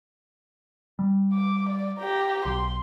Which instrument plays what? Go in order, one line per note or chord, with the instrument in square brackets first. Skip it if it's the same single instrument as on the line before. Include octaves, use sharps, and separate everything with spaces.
[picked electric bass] G3
[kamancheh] D6
D5
G4 A#5
[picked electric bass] B1 [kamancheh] C6